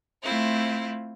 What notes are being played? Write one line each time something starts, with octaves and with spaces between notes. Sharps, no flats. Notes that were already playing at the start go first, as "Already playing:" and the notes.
A3 C4 E4 F4